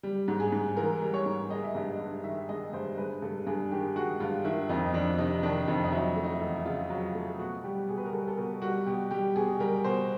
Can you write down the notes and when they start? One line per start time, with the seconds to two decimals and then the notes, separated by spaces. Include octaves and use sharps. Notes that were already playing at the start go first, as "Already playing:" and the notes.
0.03 G3
0.28 G#2
0.40 G#4
0.52 G#2
0.77 E3 A#4
1.01 G3
1.14 C#5
1.26 G#2
1.50 G#3 D#5
1.63 E5
1.75 G2 D#5
1.99 G2
2.24 D#3 E5
2.49 G#3 D#5
2.73 G2 C5
2.98 G#3 B4
3.22 G2 A4
3.47 G2 G#4
3.71 D#3 G4
3.96 G#3 F#4
4.20 G2 F4
4.45 D#3 E4
4.69 F2 D#4
4.94 F2 D4
5.18 C3 D#4
5.43 D#3 D4
5.68 F2 D#4
5.84 D#4
5.92 F#3 E4
6.16 A3
6.24 D#4
6.29 E4
6.41 E2
6.56 E4
6.66 C#3 F4
6.90 F#3
7.15 A3
7.39 B2 F#4
7.64 G3 G4
7.88 B2 G#4
7.98 B4
8.05 A#4
8.13 G3 A4
8.28 A4
8.37 B2 A#4
8.62 G3 F#4
8.86 B2 G4
9.11 G3 G4
9.36 B2 G#4
9.60 G3 A#4
9.84 B2 C5